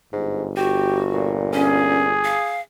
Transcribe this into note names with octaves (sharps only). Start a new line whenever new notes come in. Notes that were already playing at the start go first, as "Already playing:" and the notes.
G1 G#2
F#4 G4
A#2
C#4 G#4
F5